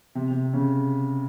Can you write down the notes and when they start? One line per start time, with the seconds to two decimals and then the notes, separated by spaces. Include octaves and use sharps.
0.15 C3
0.31 C3
0.53 C#3